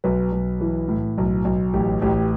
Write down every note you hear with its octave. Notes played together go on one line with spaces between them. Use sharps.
B1 B4
B1
E3
A2
B1
B1
A1 G4
A1 G4